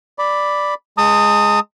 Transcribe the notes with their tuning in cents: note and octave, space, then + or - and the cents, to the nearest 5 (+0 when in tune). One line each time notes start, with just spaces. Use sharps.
D5 +0 B5 +0
G#3 +0 A5 +45 D#6 +0